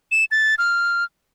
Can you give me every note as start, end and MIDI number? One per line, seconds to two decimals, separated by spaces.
0.12 0.24 100
0.31 0.55 93
0.58 1.04 89